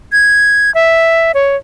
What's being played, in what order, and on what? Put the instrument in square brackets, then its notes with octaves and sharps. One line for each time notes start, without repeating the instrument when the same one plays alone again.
[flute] G#6
E5
C#5